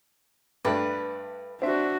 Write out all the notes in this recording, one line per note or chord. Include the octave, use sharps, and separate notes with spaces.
G2 A3 D4 B4
C4 D4 F#4 E5